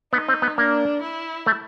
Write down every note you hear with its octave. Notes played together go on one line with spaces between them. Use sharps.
B3 D#4
C4
B3
A#3 D4
E4
A3